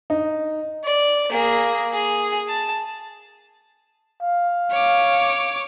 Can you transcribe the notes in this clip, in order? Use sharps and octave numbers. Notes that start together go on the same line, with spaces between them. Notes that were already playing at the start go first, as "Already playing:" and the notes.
D#4
D5
A#3 G#4
G#4
A5
F5
C#5 D6